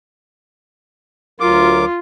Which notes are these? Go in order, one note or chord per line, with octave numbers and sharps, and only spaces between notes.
D2 F#3 F4 A#4 D6